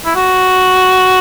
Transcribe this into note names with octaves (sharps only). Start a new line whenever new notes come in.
E4
F#4